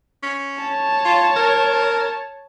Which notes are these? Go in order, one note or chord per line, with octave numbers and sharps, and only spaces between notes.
C#4
C#5 A5
F4
A#4